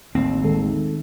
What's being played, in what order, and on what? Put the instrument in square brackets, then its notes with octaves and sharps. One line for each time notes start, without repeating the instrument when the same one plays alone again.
[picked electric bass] A1 D#2 [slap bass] C4
[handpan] D#3 A3 [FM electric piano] G#3 A4